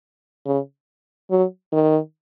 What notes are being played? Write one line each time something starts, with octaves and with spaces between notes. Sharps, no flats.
C#3
F#3
D#3